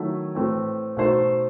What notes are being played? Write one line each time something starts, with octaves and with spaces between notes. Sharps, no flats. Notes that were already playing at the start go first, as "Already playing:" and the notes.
Already playing: D#3 F#3 A3 E4
A2 E3 A3 C4
B2 A3 D#4 A4 C5